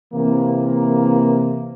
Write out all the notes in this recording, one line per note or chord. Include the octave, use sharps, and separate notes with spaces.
C3 E3 A#3